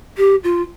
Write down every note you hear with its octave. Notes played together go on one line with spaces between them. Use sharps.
G4
F4